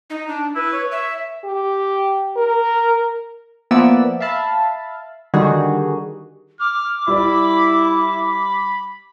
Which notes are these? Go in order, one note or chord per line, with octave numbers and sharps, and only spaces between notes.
D#4
D4
E4 B4
C#5
E5
G4
A#4
F3 A#3 B3 D5 E5 E6
E5 F5 A5 B5
D3 D#3 G3 F#4 G#4
D6 F6
G3 E4 D5 B5
B5